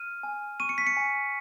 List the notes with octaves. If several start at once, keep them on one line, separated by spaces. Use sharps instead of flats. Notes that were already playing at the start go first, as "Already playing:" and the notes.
Already playing: F6 D#7
G#5
C#6 D#7
C#7
B6
C#7
G#5